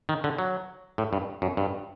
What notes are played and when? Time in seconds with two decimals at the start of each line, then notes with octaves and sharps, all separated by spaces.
0.09 D#3
0.24 D3
0.38 F#3
0.98 A2
1.13 G2
1.42 F#2
1.57 G2